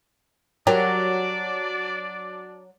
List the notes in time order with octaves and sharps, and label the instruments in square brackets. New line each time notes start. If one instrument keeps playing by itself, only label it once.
[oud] F#3 [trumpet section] D4 D5 [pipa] G4 A#4